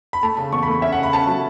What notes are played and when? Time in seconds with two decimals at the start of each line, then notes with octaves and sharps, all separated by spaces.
0.13 B5
0.23 A3 A5
0.38 C#3
0.52 E2 C#6
0.63 B5
0.68 A3
0.82 C#4 E5
0.92 F#5
0.98 C#3
1.03 B5
1.13 C#4 A5
1.27 F#3